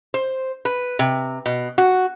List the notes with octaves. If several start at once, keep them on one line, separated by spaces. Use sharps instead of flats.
C5
B4
C3
B2
F#4